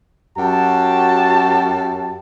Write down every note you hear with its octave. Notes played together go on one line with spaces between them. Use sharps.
F#2 F#4 G4 A5